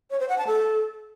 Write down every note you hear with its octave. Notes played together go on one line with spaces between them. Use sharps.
C#5
C5
F#5
A5
A4